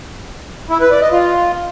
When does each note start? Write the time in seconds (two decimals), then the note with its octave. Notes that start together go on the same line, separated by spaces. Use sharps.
0.70 E4
0.81 B4
0.91 D5
1.02 D#5
1.12 F4